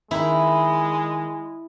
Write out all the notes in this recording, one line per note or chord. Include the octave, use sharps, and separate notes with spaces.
D#3 G#3 E4 G5 A#5